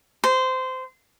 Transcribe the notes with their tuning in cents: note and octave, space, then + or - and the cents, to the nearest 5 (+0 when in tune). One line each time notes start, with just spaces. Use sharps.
C5 -20